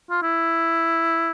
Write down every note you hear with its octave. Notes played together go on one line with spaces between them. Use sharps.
F4
E4